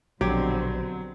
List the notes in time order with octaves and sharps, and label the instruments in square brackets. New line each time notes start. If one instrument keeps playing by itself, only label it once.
[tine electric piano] A#1 [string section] B2 D3 C4 [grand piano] F#3 [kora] G4